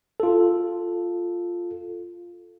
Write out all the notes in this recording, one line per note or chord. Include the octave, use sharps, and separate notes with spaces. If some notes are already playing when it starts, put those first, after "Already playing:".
F4 A4